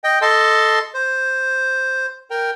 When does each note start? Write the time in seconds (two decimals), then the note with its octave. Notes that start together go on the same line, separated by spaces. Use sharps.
0.04 D#5 G5
0.22 A4 D#5 A5 C6
0.94 C5
2.30 A#4 G5